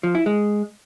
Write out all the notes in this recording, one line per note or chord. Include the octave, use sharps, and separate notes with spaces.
F3
E4
G#3